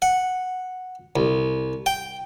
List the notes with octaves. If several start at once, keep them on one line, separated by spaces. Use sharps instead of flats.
F#5
C2
G5